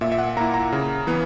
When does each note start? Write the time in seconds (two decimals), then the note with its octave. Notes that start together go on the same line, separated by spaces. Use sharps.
0.01 A#2 E5
0.12 E5
0.18 F#5
0.37 A#3 A#5
0.41 E4
0.54 A#5
0.73 C#3
1.07 E3 B3